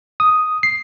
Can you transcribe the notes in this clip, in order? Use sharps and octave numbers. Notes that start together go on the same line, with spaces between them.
D#6
C7